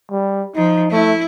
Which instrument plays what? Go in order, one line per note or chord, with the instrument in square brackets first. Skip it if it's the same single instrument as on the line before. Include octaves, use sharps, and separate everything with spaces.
[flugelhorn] G3
[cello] F3 [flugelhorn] D#4
[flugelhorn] A3 [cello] E4